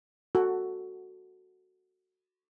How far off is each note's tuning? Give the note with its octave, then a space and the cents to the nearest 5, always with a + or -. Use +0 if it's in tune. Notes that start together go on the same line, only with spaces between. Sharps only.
F#4 +0 A4 +15